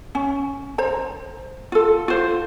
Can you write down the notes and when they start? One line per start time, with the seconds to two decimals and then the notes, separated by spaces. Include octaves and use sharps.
0.15 C#4
0.78 C5 A#5
1.72 F4 A4
2.08 F4 C5